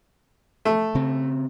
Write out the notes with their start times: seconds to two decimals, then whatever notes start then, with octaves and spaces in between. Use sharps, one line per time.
0.65 A3
0.95 C#3 C4